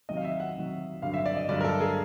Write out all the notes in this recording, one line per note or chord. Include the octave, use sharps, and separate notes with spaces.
C3 D#3 F#3 D#5
F5
E5
F#5
C3 D#3 F#3
G2 D3 F#3 F5
E5
D5
D#5
G2 D3 F#3 D5
A#4
A4
G#4